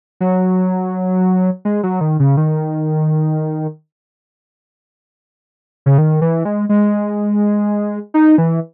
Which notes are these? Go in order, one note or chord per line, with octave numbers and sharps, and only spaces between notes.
F#3
G#3
F#3
D#3
C#3
D#3
C#3
D#3
E3
G#3
G#3
D#4
E3